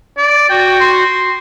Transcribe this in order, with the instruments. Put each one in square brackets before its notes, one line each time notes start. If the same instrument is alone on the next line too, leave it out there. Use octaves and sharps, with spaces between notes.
[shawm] D5
[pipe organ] F#4 [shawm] G5
[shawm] C6